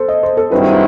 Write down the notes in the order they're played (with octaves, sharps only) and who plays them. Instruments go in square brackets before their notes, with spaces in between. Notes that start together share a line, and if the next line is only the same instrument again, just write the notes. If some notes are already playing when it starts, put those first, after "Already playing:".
Already playing: [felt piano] A4 C5
D#5
C5
A4
[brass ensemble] G2 D#3 F#3 C4 E4 [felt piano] B4